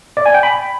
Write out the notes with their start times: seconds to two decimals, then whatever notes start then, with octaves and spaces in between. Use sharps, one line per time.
0.17 D5
0.26 G#5
0.34 G5
0.43 B5